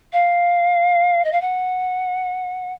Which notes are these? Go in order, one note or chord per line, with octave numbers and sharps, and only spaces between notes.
F5
D#5
F5
F#5